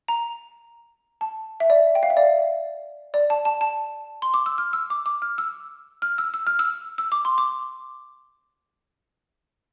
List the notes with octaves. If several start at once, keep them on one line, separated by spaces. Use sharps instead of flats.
A#5
A5
E5
D5
G5
F5
E5
D5
D5
A5
A5
A5
C6
D6
E6
F6
E6
D6
D6
F6
E6
F6
E6
E6
F6
E6
E6
D6
C6
D6